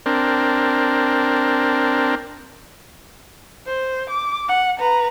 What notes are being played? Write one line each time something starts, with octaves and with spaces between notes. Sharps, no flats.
C4 D4 A#4
C5
D6
F#5
B4 A#5